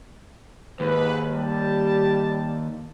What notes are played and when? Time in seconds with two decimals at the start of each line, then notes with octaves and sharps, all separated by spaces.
0.80 D#2 G#2 B4
1.33 G3 G4 A5